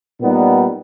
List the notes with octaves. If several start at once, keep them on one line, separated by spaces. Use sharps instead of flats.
A#2 G3 B3 D#4